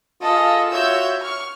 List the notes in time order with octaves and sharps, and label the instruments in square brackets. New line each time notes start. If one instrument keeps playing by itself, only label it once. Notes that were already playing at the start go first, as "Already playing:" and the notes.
[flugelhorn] F4 [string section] G#4 A4 [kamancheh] D#5 F5
[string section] F#4 E6 G6 [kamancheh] C#5 E5
[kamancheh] C#6 [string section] F6